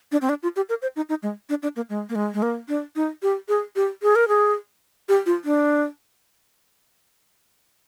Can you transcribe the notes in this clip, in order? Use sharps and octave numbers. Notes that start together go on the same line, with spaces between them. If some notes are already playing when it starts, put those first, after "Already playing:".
D4
C4
D4
F4
G4
A#4
C5
D#4
D#4
G#3
D4
D4
A#3
G#3
A#3
G#3
G#3
A#3
D4
D#4
G4
G#4
G4
G#4
A#4
G#4
G4
F4
D4